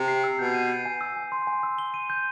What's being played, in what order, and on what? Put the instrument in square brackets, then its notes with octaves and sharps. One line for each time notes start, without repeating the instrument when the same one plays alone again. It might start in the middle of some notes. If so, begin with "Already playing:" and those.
Already playing: [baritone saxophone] C3
[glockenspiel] C7
E6
[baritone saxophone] B2 [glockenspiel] G6
[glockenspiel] D#7
C7
G#5
E6
G#5
C6
G#5
E6
G7
D#7
G6